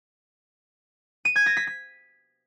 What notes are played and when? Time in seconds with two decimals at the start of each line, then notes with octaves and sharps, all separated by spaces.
1.25 D#7
1.36 G#6
1.46 A#6
1.57 B6
1.67 B6